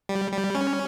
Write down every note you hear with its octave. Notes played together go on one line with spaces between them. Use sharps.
G3
G3
C#4